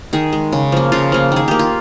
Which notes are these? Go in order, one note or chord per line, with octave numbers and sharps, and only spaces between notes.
D#3 G#4
G#3
C#3
F3 A#3
C#3 F4
F3 A#3
D#3 G#4
A#3 G4
F4